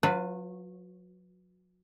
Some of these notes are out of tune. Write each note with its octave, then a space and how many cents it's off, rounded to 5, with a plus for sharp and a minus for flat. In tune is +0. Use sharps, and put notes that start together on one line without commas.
F#3 -35 F4 +0 B4 +0